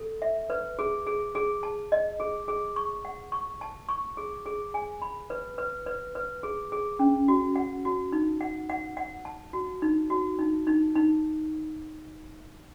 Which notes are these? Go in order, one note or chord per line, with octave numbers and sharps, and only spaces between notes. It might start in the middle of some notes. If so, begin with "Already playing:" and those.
Already playing: A4
E5
B4
G#4
G#4
G#4
A5
D#5
G#4
G#4
C#6
F#5
C#6
A5
C#6
G#4
G#4
G#5
B5
B4
B4
B4
B4
G#4
G#4
C#4
F#4
F#5
F#4
D#4
F#5
F#5
F#5
A5
F#4
D#4
F#4
D#4
D#4
D#4